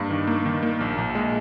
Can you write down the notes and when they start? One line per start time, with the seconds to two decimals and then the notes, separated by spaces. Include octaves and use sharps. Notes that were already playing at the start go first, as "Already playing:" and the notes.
Already playing: G2 A#3
0.11 D#3
0.27 A#3
0.46 D#3
0.63 A#3
0.81 A#1
0.98 A#1
1.15 G#3